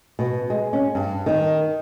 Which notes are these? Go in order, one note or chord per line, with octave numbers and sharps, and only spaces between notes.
B2
G#3
C#4
G2
D#3